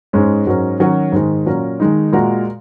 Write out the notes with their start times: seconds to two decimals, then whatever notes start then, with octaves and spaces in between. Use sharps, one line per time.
0.13 G#2 G#3 C#4
0.47 G#2 F#3 C#4 A#4
0.80 D#3 F#3 C#4 F#4 A#4
1.12 G#2 D#3 G#3
1.46 A#2 F#3 C#4 A#4
1.80 D#3 G#3 D#4
2.12 A#2 G#3 F#4 A#4